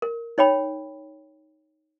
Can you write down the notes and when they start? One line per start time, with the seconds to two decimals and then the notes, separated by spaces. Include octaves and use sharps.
0.02 A#4
0.38 D#4 C#5 G5 B5